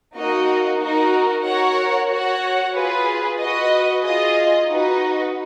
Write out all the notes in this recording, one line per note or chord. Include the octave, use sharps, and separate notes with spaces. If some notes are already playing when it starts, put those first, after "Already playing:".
A#3 D#4 F#4 A#4 D#5
D#4 F#4 A#4
F#4 A#4 C#5 F#5
F#4 C#5 F#5
F4 G#4 B4
F#4 B4 D#5
F4 G#4 D#5
D#4 F#4 B4 D#5